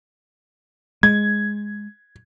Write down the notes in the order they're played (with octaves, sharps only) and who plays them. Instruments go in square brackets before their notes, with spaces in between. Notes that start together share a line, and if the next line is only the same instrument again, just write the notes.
[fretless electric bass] G#3 [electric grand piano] G#6